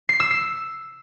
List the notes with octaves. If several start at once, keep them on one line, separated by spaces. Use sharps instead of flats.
C7
E6
C7